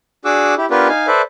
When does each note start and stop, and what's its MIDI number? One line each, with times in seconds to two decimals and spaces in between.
0.25 0.54 62
0.25 0.54 66
0.25 0.54 68
0.25 0.54 78
0.25 0.54 86
0.25 0.54 88
0.58 0.66 64
0.58 0.66 67
0.71 0.88 59
0.71 0.88 62
0.71 0.88 65
0.71 0.88 67
0.71 0.88 70
0.71 0.88 71
0.88 1.07 63
0.88 1.07 77
0.88 1.07 80
1.07 1.22 69
1.07 1.22 71
1.07 1.22 72
1.07 1.22 74
1.07 1.22 76